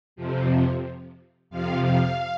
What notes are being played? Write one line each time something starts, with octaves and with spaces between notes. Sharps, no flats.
F2 C3 F3
F2 C3 F3 F5
F5